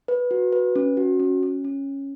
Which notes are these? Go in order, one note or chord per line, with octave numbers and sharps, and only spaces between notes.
B4
F#4
B4
C#4
F#4
C#4
C#4
C#4